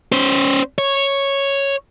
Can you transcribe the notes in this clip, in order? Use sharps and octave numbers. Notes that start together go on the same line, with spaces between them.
C#4 C5
C#5